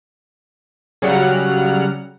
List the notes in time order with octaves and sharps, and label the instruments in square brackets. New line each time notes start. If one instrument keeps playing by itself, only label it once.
[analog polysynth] C#3 F#3 G3 F#5 F6